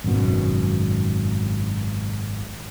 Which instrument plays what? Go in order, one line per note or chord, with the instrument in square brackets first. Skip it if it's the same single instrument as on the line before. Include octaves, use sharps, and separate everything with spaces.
[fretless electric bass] G#1 F#2 B2